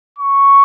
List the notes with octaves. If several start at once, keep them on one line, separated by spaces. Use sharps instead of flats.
C#6